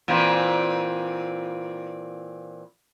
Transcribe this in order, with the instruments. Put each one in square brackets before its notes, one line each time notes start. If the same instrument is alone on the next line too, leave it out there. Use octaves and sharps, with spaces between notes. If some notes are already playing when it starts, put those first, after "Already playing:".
[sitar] A#2 E3 C4